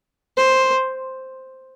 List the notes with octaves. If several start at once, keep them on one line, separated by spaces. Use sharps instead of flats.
C5